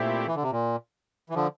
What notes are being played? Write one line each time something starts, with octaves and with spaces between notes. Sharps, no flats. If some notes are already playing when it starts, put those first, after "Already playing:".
Already playing: A#2 A3 C4 E4 G4
E3
D3
C3
A#2
E3
D3 F3